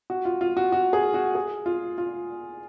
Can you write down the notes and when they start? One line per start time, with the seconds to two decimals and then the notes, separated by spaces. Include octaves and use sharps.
0.10 F#4
0.25 F4
0.41 F4
0.57 F#4
0.72 F#4
0.93 G#4
1.14 F#4
1.35 G#4
1.66 F4
1.98 F4